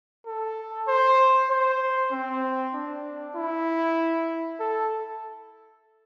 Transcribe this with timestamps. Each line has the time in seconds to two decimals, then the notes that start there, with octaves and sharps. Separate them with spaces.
0.26 A4
0.88 C5
1.50 C5
2.11 C4
2.74 D4
3.35 E4
4.60 A4